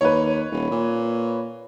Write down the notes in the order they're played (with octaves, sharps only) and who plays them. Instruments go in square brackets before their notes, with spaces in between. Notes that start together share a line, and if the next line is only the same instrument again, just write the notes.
[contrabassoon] D#2 [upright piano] B4 C#5
[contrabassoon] D#1
A#2